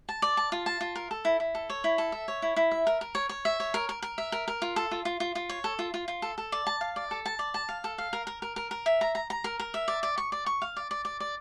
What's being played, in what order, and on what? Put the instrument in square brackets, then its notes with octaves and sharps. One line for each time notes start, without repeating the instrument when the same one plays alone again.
[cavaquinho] A5
D5
A5
F4
A5
F4
A#4
A4
E4
E4
A4
C#5
E4
A4
E5
C#5
E4
E4
E5
A#4
A#4
C#5
C#5
E5
C#5
A#4
A#4
A#4
E5
A#4
A#4
F4
A4
F4
F4
F4
F4
C#5
A4
F4
F4
F4
A4
A4
D5
A5
F5
D5
A4
A5
D5
A5
F5
A4
F5
A#4
A#4
A#4
A#4
A#4
E5
A#5
A#5
A#5
A#4
A#4
E5
D5
D5
C#6
D5
C#6
F5
D5
D5
D5
D5